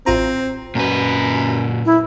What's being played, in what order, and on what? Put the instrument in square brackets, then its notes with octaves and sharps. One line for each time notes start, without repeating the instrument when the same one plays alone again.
[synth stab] A1 F4 A#5 [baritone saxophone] C4
[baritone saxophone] F#2 [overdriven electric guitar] A#2 B4
[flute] E4